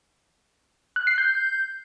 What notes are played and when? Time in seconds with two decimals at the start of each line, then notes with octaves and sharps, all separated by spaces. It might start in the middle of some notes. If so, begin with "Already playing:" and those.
0.96 F#6
1.07 C7
1.18 G6